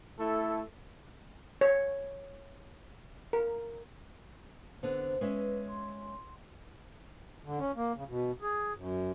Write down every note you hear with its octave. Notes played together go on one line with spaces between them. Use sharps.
A3 E4 A4
C#5
A#4
D3 B3 C4 C5
G#3 C#4 B4 E5
C6
D3
C#4
A#3
C#3
B2
G#4
F#2